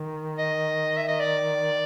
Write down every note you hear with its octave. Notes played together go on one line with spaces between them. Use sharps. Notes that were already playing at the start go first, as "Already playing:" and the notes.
Already playing: D#3
D#5
E5
D#5
D5